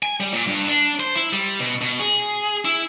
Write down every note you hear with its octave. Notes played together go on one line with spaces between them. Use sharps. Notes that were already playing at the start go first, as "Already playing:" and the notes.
G#5
G3
A#2
G2
D4
C5
E4
G3
B2
B2
G#4
E4